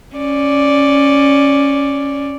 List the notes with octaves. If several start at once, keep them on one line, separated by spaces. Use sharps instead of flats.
C#4 D5